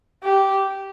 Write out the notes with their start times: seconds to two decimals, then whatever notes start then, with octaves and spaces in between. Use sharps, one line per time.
0.23 G4